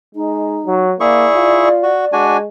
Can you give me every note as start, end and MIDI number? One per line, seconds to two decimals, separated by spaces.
0.15 0.61 56
0.15 0.85 63
0.66 0.94 54
1.00 1.27 58
1.00 1.69 64
1.00 1.69 68
1.00 2.27 74
1.00 1.69 85
1.35 1.88 65
1.83 2.05 66
2.13 2.48 56
2.13 2.37 62
2.13 2.37 66
2.13 2.37 80